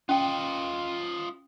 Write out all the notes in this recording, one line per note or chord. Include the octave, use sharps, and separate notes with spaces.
C#4 F4 D#5 G5